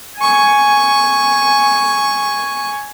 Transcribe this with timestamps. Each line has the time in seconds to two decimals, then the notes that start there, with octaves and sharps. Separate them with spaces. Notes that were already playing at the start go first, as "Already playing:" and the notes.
0.17 G#5 C#6